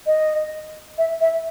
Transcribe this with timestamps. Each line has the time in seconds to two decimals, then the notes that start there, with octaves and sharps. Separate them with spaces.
0.07 D#5
0.98 E5
1.21 E5